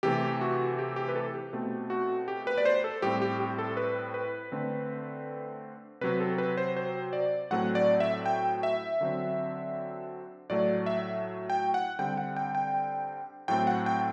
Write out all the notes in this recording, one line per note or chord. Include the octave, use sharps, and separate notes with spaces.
C3 E3 A3 C4 G4
F#4
G4
G4
B4
A4
G4
B2 A3 C4
F#4
G4
B4
D5
C5
A4
A2 G3 C4 G4
G4
G4
A4
B4
B4
D3 A3 C4
C3 F#3 C4 B4
A4
B4
C5
C5
D5
A2 F#3 A3 C4 F#5
D5
E5
G5
E5
D3 F#3 C4
A2 F#3 A3 D5
E5
G5
F#5
D3 G3 C4 G5
F#5
G5
G5
A2 F#3 A3 C4 G5
F#5
G5